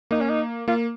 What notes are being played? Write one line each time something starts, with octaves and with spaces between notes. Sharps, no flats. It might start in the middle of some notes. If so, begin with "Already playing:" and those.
A#3 D#4
C#4
D#4
A#3 F4